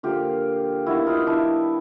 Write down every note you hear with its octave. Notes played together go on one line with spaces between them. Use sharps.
D3 F3 A#3 F4 G4
D#3 G3 B3 E4 F#4
D#4 F4
D4 E4